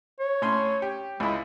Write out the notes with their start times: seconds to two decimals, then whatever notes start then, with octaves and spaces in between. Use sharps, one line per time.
0.20 C#5
0.42 A2 C#4 C6
0.82 G4
1.20 C#2 G#3 E4